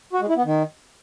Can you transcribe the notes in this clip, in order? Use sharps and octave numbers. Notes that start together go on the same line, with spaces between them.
F#4
G#3
E4
B3
D#3